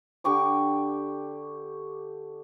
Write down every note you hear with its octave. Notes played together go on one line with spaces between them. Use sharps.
D3 G4 C#6 D6